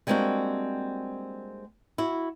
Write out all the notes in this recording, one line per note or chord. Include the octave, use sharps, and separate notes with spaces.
G3 G#3 A#3 C4 D4 F#4
E4 F#4